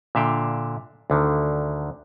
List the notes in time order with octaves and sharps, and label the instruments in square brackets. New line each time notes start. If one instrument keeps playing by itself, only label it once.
[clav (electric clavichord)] A#2 D3 E5 F5 G5
D2 D3 D#3